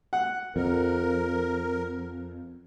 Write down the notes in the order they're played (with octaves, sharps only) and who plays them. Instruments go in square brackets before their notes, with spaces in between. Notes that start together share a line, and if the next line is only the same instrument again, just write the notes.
[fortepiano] F#5
[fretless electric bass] F2 [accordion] A#4